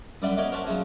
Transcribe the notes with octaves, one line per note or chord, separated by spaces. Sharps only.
F#2 G3 D5 E5 F#5 G5
G4 A#4 C#5 D#5 F#5 D6
A#4 C5 C#5 E5 F#5 A5
C#3 F3 F#3